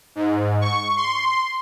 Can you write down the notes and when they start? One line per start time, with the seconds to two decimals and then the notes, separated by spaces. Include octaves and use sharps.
0.15 G#2
0.61 C#6
0.96 C6